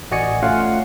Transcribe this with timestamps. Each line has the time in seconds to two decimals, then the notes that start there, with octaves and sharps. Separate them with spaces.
0.11 A1 F#4 D5 D#5 G#5 C#7
0.43 A3 C#4 F4 F5 F#5